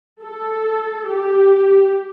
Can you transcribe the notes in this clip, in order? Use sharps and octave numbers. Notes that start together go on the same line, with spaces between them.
A4
G4